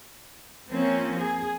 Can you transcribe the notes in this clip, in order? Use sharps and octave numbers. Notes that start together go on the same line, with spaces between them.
F3 A#3 C4 C#4
G#4